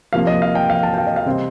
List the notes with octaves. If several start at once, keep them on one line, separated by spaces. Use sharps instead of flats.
C3 F3 A#3 F5
D#5
F5
G5
F5
A5
G5
F5
D#5
F5
C3 G3 C4 D#5